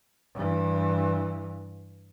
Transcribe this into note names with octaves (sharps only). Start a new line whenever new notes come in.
G2 E3